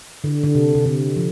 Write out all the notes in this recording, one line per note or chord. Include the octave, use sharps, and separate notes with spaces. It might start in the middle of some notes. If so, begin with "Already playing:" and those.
D3
D3
C3
C3
D3
F3